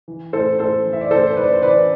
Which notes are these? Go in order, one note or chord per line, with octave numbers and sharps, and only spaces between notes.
E3
A2 A4 C5
A2 A4 C5
E3
E5
D5
A2 A4 C5
C5
E3 B4 D5
C5
E3 B4 D5